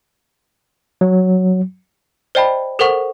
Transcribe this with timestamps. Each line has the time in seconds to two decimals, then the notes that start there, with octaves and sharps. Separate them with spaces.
1.01 F#3
2.35 C5 D5 D#5 G5 A5 B5
2.79 A4 A#4 C5 F#5 C#6